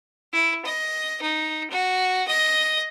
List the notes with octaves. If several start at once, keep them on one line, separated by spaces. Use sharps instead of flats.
E4
D#5
D#4
F#4
D#5